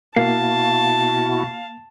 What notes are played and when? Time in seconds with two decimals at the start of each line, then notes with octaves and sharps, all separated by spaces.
0.16 B2 A#3 E4 F#4 F5 A5